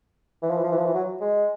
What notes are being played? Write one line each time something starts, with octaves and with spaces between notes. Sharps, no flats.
E3
F3
E3
F3
E3
F3
E3
F#3
G#3